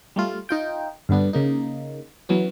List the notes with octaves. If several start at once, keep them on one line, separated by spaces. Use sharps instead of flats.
G3 A3 F4
D#4 F4 G5
G2 D3 B3 D4
C#3 A#3 D#4
E3 F#3 B3 C#4